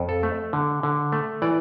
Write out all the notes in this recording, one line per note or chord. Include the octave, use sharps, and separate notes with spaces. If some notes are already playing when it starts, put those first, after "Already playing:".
Already playing: F2
A4
A3
D3
D3
A3
E3 D5